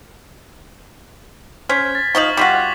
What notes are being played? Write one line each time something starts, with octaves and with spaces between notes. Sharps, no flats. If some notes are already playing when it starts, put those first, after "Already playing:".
C#4 C5 F6 G#6 B6
A6
F3 D#4 F5 C#6 F#7
G3 F4 F#4 D6 B6 F#7